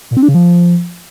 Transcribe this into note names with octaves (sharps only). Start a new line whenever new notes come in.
A#2
C4
D4
C#3
F3